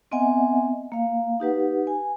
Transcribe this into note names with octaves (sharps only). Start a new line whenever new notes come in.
B3 C4 D#5 E5 F#5 G#5
A#3 F5
D#4 G4 B4 F#5
G#5